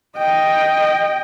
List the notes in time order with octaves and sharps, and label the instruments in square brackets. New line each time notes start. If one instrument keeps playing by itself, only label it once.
[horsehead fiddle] D#5 G5